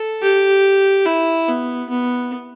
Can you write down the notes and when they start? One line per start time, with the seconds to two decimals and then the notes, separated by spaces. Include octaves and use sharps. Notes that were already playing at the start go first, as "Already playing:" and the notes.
Already playing: A4
0.22 G4
1.05 E4
1.48 B3
1.89 B3